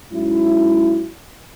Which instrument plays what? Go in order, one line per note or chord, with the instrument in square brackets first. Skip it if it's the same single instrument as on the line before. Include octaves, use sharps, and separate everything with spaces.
[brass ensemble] G#2 F#3 C#4 E4